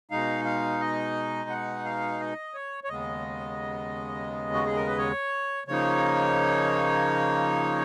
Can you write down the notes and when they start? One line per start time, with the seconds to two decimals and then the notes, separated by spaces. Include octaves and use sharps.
0.11 B2 G#3 D#4 F5
0.45 F5
0.80 D#5
1.50 F#5
1.85 F5
2.20 D#5
2.54 C#5
2.84 C#5
2.89 D#2 C#3 G#3 B3 D#5
4.54 F#4
4.65 G#4
4.76 A#4
4.87 B4
4.98 C#5
5.68 C#3 F3 A#3 D#4 C#5